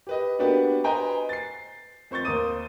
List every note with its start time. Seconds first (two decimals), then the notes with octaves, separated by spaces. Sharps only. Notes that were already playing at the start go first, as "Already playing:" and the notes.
0.07 G4 B4 D#5
0.39 A#3 B3 D4 F#4 G4 B4
0.84 B4 C5 D#5 G5 G#5 A#5
1.29 A6 C7
2.11 F2 C5 C#6 G6 A6
2.25 D#2 A#4 C5 D6 D#6 D#7